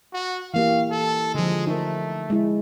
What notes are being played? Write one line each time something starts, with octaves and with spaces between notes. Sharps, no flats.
F#4
E3 A#3 G4 F5
A4
D3 F3 G#3
A3 D#4 A#4
G#3 E4